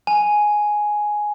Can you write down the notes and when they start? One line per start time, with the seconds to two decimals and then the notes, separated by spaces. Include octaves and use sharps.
0.07 G#5